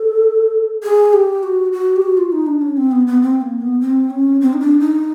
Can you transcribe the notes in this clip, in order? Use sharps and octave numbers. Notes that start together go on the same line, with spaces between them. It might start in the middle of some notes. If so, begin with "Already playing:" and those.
Already playing: A4
G#4
G4
F#4
F#4
G4
F#4
F4
D#4
D4
C#4
C4
B3
B3
C4
A#3
B3
C4
C#4
C4
D#4
D4
D#4